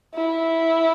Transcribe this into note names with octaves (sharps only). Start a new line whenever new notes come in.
E4